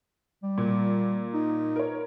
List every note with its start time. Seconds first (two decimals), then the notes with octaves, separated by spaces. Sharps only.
0.43 G3
0.58 A#2
1.33 D#4
1.76 A#4 C#5